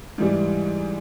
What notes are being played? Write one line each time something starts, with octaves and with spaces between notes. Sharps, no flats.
G#2 E3 G3